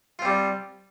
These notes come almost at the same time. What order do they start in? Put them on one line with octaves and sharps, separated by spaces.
F4 C4 G3